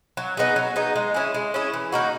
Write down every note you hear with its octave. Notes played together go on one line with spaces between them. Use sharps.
F#3
B3 D#4 G#4
F#3
B3 D#4 G#4
G#3
C#4 E4 G#4
G#3
C#4 E4 G#4
E3
A#3 D#4 F#4